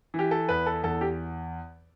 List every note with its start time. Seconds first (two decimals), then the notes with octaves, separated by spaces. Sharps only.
0.14 E3 G4
0.31 A4
0.49 E2 B4
0.66 A4
0.84 E2 A4
1.01 G4